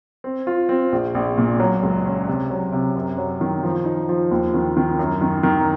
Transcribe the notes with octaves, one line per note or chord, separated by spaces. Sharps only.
C4
F4
C4
A#1
A#1
A#2
F#3
C#2
C#4
C3
F#3
C3
F#2
F#3
D#3
F3
D#4
F3
D#2
D#3
D#3
F#2
D#3
D#3